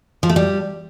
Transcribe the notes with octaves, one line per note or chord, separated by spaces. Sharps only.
F3
A3
G3